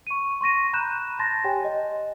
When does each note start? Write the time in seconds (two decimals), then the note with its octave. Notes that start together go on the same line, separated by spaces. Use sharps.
0.07 C#6 D#7
0.41 C6 C#6 A#6 D#7
0.73 A#5 B5 F#6 G6 E7
1.19 A5 C6 A6 A#6
1.44 G4 C#5 G5 G#5 C6
1.64 D#5